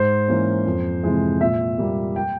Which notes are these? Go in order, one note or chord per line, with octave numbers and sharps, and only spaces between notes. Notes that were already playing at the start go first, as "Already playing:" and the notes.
Already playing: G#2 C5
E3 A#3 C#4
F2
C3 E3 G#3
A#2 E5
G3 A#3
G5